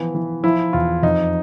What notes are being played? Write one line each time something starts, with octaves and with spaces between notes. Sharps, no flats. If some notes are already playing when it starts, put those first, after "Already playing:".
Already playing: E3 F3 B3
E3
F3 E4
E2 F4
F2 D#4